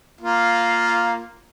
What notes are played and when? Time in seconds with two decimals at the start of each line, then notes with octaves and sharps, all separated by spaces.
0.21 A#3 F4